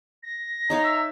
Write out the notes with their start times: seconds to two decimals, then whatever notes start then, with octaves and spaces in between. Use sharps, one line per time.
0.23 A#6
0.70 D#4 C#5 F5 A#5
0.84 E5